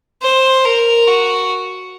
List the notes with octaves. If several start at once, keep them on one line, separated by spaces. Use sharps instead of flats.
C5
A#4
F#4